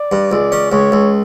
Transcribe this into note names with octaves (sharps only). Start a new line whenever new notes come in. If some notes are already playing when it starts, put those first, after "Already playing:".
Already playing: D5
G2
C#2
C#4
C#2 C#5
C#2